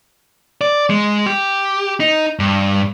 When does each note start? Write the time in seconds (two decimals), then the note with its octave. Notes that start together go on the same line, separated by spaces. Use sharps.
0.61 D5
0.90 G#3
1.26 G4
2.00 D#4
2.39 G2